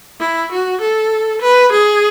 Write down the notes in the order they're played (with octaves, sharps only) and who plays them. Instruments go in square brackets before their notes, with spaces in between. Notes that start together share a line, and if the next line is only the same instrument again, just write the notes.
[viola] E4
F#4
A4
B4
G#4